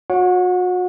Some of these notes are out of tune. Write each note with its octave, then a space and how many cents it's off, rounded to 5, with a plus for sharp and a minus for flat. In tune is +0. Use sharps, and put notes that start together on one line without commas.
F#4 -40 C#5 +0 F#5 -30